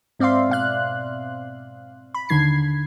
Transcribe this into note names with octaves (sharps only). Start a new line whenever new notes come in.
G#2 C4 D5 E5 F5 C6
B2 F5 F#6
B5
D#2 D3 D#3 G#6 C7